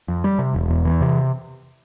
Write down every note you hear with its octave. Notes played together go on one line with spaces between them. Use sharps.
F2
G3
C3
E1
E2
E3
C3